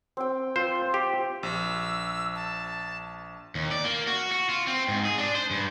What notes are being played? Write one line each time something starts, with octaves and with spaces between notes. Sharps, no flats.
C4 G5
F4 C5
G4
A#1 E6
A5
D#2
D5
A#3
F#4
F#4
F4
C4
G#2
G#4
D4
C5
G2